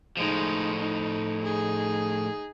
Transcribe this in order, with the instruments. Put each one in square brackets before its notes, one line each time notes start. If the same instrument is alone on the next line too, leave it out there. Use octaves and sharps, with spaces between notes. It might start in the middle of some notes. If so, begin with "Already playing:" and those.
[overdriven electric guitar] A2 F3 [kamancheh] G#3 D#4
[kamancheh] D#4
D#4 G#4